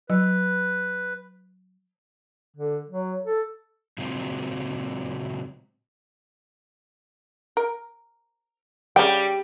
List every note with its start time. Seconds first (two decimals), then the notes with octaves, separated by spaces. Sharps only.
0.10 F#3 B4
2.57 D3
2.89 F#3
3.25 A4
3.98 A#2 C#3 F#3 G#3 C4 F4
7.57 A#4
8.96 C#3 G3 G5